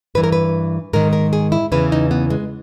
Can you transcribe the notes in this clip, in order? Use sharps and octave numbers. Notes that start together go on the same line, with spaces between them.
G2 E3 B4
A#4
B4
G#2 D#3 A#4
A#4
G#4
E4
E2 C#3 E3 B4
D#4
B3
G#3